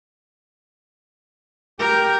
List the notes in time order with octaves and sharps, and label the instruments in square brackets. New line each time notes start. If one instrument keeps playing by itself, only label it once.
[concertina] G4 G5 [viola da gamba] A#4